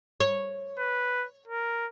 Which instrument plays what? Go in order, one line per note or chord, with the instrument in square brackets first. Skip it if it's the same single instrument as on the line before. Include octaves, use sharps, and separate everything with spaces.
[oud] C#5
[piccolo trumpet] B4
A#4